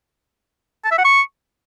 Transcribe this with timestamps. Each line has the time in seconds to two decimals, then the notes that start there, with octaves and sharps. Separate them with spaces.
0.85 A5
0.91 E5
0.98 F#5
1.05 C#6